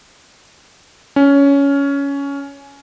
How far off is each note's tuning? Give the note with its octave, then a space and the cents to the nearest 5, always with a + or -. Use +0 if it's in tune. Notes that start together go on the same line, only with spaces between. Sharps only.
C#4 +15